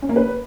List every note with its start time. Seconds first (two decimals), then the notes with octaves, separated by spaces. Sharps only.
0.02 C#4
0.09 A#3
0.16 B4